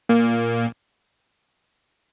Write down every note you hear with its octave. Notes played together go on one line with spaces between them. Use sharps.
A#2 A#3